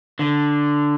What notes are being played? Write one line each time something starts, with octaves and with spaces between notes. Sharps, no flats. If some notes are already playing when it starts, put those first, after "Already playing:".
D3